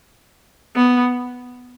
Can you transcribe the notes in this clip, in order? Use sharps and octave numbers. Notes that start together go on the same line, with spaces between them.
B3